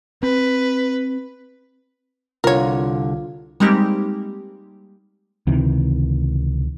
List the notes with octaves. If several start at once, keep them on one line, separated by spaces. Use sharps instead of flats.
C4 B4
C2 D3 F4 A#4 C#5
G3 G#3 A#3 C4 D#4 G4
C#2 C3 D#3 E3